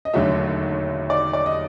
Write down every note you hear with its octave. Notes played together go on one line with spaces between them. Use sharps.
D#5
E1 D#2 D3 F#3 A3 E5
D5
D5
D#5